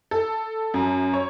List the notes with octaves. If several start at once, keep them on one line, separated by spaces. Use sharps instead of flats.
A4
F#2
C#5